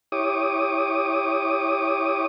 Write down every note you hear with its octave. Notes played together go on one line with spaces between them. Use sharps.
E4 G4 C#5 D6 D#6